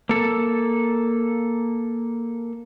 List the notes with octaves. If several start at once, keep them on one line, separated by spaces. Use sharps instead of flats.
A#3 A4